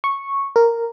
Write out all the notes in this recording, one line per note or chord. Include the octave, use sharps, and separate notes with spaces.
C#6
A#4